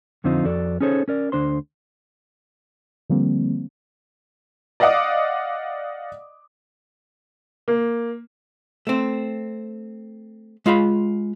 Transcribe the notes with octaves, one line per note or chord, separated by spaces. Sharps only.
F2 D3 F3 C4 D#4 F4
F2 F#4 A4 D5
C#4 D#4 G#4 A4 C5 C#5
C#4 A#4 D5
D2 D4 C5 C6
D3 F3 G3 A#3 C4
D5 D#5 F5 F#5 D6 D#6
A#3
A3 C4
G#3 F4 F5 B5